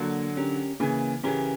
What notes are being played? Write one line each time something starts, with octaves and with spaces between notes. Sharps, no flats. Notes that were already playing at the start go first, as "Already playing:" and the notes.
Already playing: D3 F#3 A#3
C#4 G4 A#4
C#3 E3 A#3
C#3 E3 C#4 G4 A#4